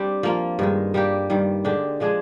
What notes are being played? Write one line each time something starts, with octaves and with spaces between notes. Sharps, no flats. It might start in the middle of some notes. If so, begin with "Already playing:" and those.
Already playing: G3 C4 D4 G4
F3 A#3 F4
G2 D#3 G#3
G3 A#3 D4 G4
G2 D#3 G3
D3 G#3 D4 G4
F3 G#3 D4 G#4